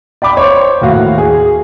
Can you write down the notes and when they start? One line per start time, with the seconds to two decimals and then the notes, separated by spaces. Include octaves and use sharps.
0.22 D5 G5 B5 D6
0.37 C5 C#5
0.81 D#2 A2 F#4 F5
1.18 G#4